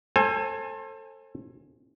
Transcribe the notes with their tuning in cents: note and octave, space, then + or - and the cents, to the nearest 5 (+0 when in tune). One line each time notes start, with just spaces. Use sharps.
A4 +20 C5 +35 G#5 +0